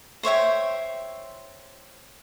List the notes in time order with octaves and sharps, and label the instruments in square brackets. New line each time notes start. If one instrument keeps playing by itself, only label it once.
[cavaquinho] C5 C#5 E5 G5